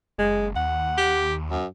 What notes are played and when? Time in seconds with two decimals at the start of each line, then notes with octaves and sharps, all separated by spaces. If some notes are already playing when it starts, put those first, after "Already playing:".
0.18 F#1 G#3
0.56 D#2 F#5
0.98 G4
1.51 F#2